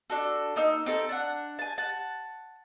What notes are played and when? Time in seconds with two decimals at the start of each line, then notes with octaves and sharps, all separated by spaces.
0.10 D4 F#4 A4
0.56 A#3 D#4 E6
0.86 C4 D#4 A4
1.09 D4 F#5
1.59 G#5 A5
1.78 F#5 A5